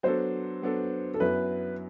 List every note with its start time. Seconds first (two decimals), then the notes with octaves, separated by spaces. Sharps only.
0.03 F#3 B3 D4 A4 C5
0.62 F#3 B3 D4 A4
1.14 A4
1.20 F#2 F#3 B3 E4 B4